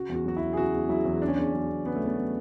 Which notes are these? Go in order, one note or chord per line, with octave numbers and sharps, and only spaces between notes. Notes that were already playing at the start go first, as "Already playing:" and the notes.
Already playing: C#3 F#4
E2
F#4
F#3 F#4
E2 E4
G#4
C#3 F#4
E2
F#3 E4
E2
C#3 D4
C#4
E2 D4
F#3 C#4
E2
C#3 B3
A3
E2
B3
F#3